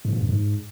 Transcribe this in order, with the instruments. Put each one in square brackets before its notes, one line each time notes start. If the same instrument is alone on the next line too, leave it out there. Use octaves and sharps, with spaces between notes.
[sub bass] G#2
A#2
F#2
G#2